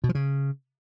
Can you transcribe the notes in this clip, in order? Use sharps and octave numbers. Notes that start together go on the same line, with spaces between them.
B2
F3
C#3